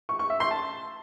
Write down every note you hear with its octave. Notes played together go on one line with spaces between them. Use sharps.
C#6
C#6
E5
C6
A5